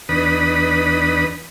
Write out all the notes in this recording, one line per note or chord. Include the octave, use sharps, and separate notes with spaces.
E2 D4 D#4 B4 B5 D#6